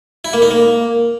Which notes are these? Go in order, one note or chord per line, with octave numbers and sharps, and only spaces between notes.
E4
A#3
D#4
A#3